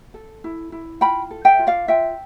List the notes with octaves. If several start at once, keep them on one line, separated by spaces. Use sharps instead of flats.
A4
E4
E4
F4 G5 B5
A4
E5 G5
F4
D5 F5
F4 E5 G5